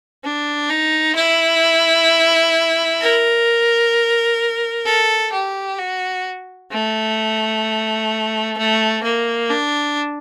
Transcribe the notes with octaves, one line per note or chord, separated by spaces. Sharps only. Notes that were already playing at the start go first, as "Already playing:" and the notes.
D4
D#4
E4
A#4
A4
G4
F#4
A3
A3
A#3
D4